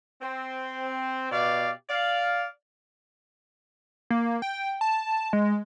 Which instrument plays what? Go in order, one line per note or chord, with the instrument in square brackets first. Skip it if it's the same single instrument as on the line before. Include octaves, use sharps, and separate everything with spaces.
[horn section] C4
B2 B3 G4 D5 F5
D5 F5
[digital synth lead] A#3
G5
A5
G#3